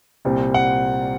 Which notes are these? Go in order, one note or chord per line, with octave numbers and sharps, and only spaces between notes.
C2 A#2 G3 C4
F#5